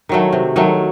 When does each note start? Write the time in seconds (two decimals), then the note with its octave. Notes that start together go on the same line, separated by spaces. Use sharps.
0.09 D#3 F#3 A3
0.33 C3
0.56 D#3 F#3 A3